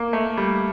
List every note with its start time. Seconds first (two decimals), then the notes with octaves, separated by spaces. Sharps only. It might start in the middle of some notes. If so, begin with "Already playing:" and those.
Already playing: A#3
0.13 A3
0.37 G3